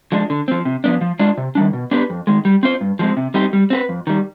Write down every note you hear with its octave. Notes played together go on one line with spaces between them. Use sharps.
F3 G#3 D4
D3
F3 C4
C3
F3 B3 D4
F3
G#3 D4 F4
C3
D#3 G3 D4
B2
B3 D4 G4 B4
F2
D#3 G#3
G3
C4 F4 C5
G2
F3 G#3 C4
C3
G3 C4 D#4 G4
G3
C4 G4 B4
F2
D#3 G3